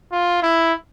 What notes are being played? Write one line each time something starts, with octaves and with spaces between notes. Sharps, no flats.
F4
E4